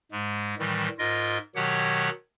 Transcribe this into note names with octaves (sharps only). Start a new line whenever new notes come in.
G#2 G#3
A2 D#3 E3 G3
G#2 F4 A#4 D#5 A#6
B2 D#3 F#3 G4 C#5 F#5